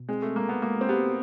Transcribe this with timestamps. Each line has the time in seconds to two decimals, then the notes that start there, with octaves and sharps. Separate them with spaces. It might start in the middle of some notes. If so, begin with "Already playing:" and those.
Already playing: B2
0.09 G#3 C4
0.22 A3
0.35 G#3 A#3
0.49 B3
0.62 G#3 A#3
0.81 C4
0.89 B3 G4